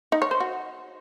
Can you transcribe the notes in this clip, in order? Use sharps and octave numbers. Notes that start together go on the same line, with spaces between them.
D#4
C#5
C5
F#4